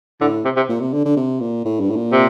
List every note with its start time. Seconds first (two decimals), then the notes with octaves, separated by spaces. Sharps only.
0.21 A2 D3
0.45 C3
0.56 C3
0.69 A#2
0.80 C3
0.93 D3
1.05 D3
1.17 C3
1.40 A#2
1.65 A2
1.80 G2
1.90 A2
1.96 A#2
2.12 C3